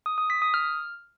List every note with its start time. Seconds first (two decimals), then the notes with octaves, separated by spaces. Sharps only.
0.06 D#6
0.18 D#6
0.30 B6
0.42 D#6
0.54 F6